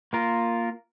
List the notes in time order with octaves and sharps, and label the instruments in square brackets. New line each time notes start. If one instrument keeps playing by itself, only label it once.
[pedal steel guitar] A#3 F4 A#4